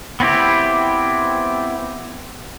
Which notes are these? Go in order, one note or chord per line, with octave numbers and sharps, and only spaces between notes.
B3 C4 E4 G4